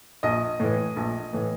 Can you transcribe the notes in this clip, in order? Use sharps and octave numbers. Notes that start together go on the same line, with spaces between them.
A#1 D#5
A2 E3
A#1
A2 E3